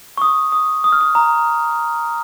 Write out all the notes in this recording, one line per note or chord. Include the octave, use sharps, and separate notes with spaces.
C#6
D#6
D#6
D#6
F6
D#6
A#5